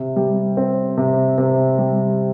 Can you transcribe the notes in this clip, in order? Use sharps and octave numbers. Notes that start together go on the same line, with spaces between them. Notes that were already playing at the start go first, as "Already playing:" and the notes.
Already playing: C3
G3
C4
C3
C3
G3